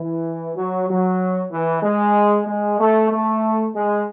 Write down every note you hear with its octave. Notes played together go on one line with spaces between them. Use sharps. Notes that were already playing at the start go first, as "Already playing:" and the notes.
Already playing: E3
F#3
F#3
E3
G#3
G#3
A3
A3
G#3